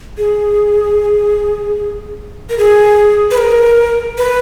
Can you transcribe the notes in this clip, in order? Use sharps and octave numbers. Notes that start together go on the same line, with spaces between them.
G#4
A#4
G#4
B4
A#4
B4